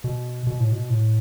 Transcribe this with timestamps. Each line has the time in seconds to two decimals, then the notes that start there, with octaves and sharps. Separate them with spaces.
0.04 B2
0.47 B2
0.60 A2
0.72 B2
0.90 A2